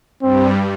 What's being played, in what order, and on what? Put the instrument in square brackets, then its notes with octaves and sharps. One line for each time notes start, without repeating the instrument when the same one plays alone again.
[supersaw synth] G2 G3 [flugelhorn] C4